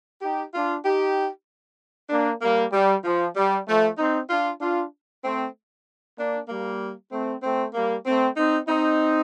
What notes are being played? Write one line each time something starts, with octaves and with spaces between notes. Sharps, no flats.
D#4 G4
D4 F4
D#4 G4
A#3 D4
G3 A#3
G3
F3
G3
F3 A3
C4 D#4
D4 F4
D4 F4
A3 C4
A#3 D4
G3 A#3
A3 C4
A3 C4
G3 A#3
A3 C4
C4 D#4
C4 D#4